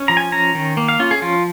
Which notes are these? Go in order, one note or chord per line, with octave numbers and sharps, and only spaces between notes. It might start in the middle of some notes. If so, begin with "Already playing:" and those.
Already playing: C#4
F3 A#5
G#5
C#4 A#5
D#3
A#3
F5
C#4 F4
G#4
F3 F4